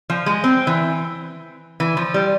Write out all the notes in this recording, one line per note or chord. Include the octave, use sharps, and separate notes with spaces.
F3
G#3
C4
E3
E3
F3
G3